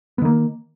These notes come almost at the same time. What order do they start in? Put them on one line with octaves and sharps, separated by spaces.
B3 D#3 A#3